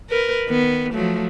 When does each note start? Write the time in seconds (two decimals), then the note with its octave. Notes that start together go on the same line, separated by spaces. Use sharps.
0.10 A#4 B4
0.48 D#3 B3
0.94 F3 F#3 A3